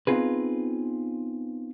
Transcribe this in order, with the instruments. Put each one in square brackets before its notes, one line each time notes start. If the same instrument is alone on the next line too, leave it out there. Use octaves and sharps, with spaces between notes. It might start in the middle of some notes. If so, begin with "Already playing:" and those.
[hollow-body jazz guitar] B3 C4 D#4 F4 G#4 B4